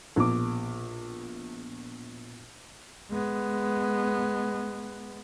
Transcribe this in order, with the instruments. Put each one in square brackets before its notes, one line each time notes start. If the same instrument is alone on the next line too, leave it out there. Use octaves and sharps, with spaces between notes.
[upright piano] A#1 B2 D6
[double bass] G#3 B3